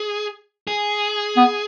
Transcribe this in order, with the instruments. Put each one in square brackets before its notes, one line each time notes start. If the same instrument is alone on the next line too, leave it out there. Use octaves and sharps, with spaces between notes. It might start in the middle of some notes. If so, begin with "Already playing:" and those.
Already playing: [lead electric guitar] G#4
G#4
[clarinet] B3